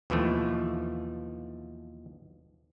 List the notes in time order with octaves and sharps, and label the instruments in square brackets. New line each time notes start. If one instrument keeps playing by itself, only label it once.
[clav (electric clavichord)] D#2 B2 E3 F3 A3